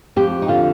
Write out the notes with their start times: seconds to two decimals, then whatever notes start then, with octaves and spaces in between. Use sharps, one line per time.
0.16 F2 G4
0.42 D#4
0.48 D3 F4